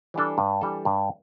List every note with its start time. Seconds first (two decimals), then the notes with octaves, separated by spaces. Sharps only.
0.14 E3 G3 D4 A4
0.38 G2
0.61 E3 G3 D4 A4
0.85 G2